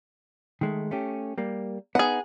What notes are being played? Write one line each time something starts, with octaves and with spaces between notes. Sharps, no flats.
D#3 G#3 A3
A3 C#4 G4
G3 A#3
B3 D#4 G#4 F#5